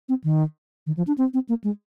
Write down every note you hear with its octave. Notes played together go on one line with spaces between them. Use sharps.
C4
D#3
D#3
F3
D4
C4
C4
A#3
G#3